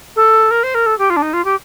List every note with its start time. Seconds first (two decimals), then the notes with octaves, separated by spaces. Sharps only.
0.16 A4
0.51 A#4
0.63 C5
0.74 A#4
0.86 A4
0.98 G4
1.10 F4
1.16 D4
1.22 D#4
1.33 F4
1.44 G4